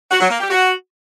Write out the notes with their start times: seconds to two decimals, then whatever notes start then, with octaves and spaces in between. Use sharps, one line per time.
0.10 F#4
0.20 F#3
0.30 A#3
0.40 G4
0.50 F#4